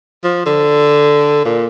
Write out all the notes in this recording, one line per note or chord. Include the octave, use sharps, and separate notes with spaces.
F3
D3
A#2